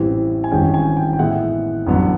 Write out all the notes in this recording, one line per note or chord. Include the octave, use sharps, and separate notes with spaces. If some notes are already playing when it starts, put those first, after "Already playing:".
Already playing: A1 A2 E3 G3 C4
G#5
G#1 G2 E3 G#3 C#4 G5
G#5
G5
G5
A2 E3 G#3 B3 E4 F#5
A1 G2 D3 F#3 B3